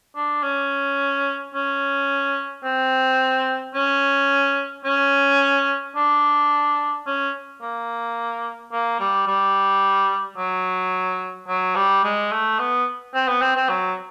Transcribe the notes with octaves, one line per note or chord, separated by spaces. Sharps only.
D4
C#4
C#4
C4
C#4
C#4
D4
C#4
A#3
A#3
G3
G3
F#3
F#3
G3
G#3
A3
B3
C4
B3
C4
C4
F#3